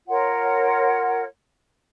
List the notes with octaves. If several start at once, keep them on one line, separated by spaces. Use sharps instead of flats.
F4 A#4 C#5 F#5